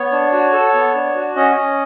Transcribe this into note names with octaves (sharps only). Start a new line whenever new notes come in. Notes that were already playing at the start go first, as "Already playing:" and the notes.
Already playing: B3 C#5
D4
F#4
A4
B3
D4
F#4
C#4 D#5
C#4